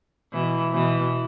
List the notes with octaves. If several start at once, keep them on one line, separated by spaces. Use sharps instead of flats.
B2 E3
B2 E3